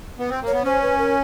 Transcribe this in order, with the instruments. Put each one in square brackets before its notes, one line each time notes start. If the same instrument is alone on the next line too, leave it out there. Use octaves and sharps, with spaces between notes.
[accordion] B3
C4
A#3
[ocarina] C#5
[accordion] B3
[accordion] C#4 [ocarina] C5
[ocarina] B4
A#4